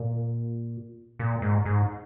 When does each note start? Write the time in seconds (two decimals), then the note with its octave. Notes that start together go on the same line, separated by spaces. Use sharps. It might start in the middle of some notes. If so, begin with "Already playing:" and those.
Already playing: A#2
1.19 A#2
1.42 G#2
1.65 G#2